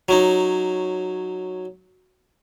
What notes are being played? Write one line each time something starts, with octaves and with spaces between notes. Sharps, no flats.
F#3 C#4 D#4